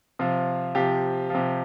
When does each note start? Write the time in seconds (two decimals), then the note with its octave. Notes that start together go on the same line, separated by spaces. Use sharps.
0.19 C3 F3 F4
0.75 C3 F3 G4
1.30 C3 F3